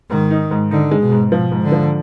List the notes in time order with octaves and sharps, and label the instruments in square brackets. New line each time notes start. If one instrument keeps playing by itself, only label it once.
[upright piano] G#2 [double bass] D#3
[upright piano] D#4
G#2
[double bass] D3 [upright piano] D#4
[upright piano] G#3
[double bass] B2
[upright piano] G#2
[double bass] B2 [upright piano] F3
[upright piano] G#2
[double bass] D3
[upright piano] F3